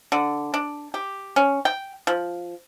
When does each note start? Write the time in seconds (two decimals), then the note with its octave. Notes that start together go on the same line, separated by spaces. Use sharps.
0.12 D3
0.54 D4
0.94 G4
1.36 C#4
1.65 G5
2.07 F3